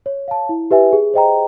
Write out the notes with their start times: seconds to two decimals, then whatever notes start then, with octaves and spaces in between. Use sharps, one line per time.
0.06 C#5
0.28 F5 A5
0.49 E4
0.71 G4 B4 E5 G#5
0.93 G#4
1.14 C5 D#5 G5 A#5